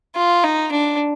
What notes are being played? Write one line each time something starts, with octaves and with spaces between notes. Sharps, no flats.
F4
D#4
D4